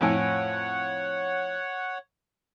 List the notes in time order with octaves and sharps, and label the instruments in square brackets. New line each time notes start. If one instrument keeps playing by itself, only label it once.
[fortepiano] F2 A2 G#5 [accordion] C#5 F#5